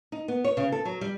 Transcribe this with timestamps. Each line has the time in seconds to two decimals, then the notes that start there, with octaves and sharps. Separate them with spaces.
0.12 D#4
0.28 B3
0.44 C#5
0.57 C#3
0.72 A4
0.85 F#3
1.01 G3